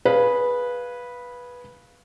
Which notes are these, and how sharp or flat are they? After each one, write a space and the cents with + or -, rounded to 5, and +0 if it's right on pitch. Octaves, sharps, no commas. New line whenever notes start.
G#4 +0 B4 -10 F5 +0